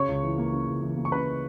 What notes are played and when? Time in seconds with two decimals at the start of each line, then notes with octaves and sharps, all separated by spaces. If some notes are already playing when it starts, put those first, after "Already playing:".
Already playing: C#3 C#5 C#6
0.08 C#2
0.23 E3
0.38 A#3
0.53 C#3
0.67 C#2
0.83 E3
0.97 A#3
1.05 C#6
1.12 C#3 B4 B5